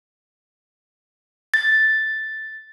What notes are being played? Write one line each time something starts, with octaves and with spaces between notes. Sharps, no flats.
A6